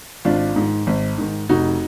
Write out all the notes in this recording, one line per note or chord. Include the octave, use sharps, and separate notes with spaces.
G#1 D4 F4
G#2 D#3
G#1
G#2 D#3
F1 D#4 F#4